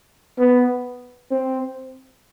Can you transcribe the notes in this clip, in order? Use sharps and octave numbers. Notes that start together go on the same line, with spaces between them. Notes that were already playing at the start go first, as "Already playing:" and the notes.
B3
C4